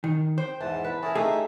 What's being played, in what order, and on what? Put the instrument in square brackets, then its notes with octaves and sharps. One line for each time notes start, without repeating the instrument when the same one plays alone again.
[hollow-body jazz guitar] D#3
[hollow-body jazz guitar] C5 [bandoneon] G5
[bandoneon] E2 G#2 A5 [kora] E3
[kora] B4
[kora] C#4 A#4 [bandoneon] E4 G#4 A5
[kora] A3 F4 G4 [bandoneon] D#4 E5 [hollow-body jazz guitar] G#4